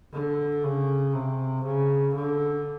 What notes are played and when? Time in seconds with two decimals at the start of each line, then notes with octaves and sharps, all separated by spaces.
0.13 D3
0.64 C#3
1.14 C3
1.65 C#3
2.15 D3